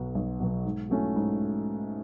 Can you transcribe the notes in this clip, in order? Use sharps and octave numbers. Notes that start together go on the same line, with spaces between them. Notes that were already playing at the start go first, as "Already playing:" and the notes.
Already playing: B1 B2 F#3 B3
B1
B2 F#3 B3
G#2
F#3 A3 C#4 E4
G#2